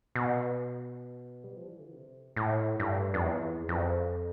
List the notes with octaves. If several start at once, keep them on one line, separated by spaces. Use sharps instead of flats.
B2
G3
F3
E3
D3
C3
A2
G2
F2
E2
F2